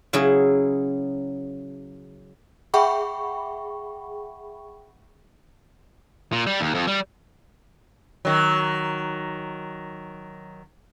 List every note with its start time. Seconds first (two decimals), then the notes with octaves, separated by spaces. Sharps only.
0.13 C#3 F#3 E4 G#4
2.74 G#4 E5 F#5 G5 B5 C#6
6.32 A#2
6.47 G3
6.60 D#2
6.75 F2
6.87 G3
8.25 D#3 F#3